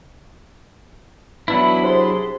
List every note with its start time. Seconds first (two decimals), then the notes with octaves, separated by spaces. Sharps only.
1.48 E3 F#3 B3 D4 E4 B5
1.84 C3 G#4 C5 C6